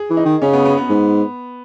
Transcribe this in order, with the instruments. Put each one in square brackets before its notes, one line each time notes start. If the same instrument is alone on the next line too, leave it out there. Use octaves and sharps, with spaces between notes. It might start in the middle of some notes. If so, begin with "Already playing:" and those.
Already playing: [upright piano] G#4
[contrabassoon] E3
[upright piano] D#4
[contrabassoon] D#3
[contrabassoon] C#3 [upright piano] C#4
[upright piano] B3
B3
B3
[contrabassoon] G#2